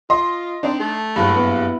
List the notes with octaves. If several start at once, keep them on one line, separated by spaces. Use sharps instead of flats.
F4 D#5 C6
C4 D4 D#4 D5
A3
F#1 G2 E4 F#4 B4
B3